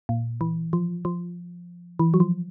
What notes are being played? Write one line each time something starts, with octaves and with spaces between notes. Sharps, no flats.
A#2
E3
F3
F3
E3
F#3
F3